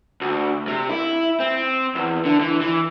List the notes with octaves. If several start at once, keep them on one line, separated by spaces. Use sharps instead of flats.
D2
C3
E4
C4
E2
D3
E3
E3